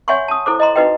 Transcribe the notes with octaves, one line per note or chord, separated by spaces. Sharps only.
C#5 E5 F#5 G#5 C6 C#6
A5 D#6
E4 A4 C5 D6
D#5 A#5 C6
D#4 F#4 B4 D#5 G5